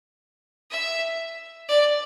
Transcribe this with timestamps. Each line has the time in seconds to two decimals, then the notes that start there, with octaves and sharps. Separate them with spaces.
0.71 E5
1.68 D5